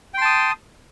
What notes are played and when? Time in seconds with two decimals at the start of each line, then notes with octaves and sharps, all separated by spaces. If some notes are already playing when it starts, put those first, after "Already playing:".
0.14 G5
0.18 C6
0.22 A5
0.25 D#6